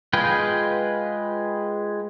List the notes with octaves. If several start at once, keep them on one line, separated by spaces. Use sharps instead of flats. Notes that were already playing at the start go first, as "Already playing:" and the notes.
G#3 F4 G#4 B4 G5